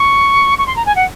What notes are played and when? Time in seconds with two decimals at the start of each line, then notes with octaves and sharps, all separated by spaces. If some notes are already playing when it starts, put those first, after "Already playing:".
Already playing: C#6
0.58 C#6
0.67 C6
0.76 A#5
0.86 G#5
0.96 F#5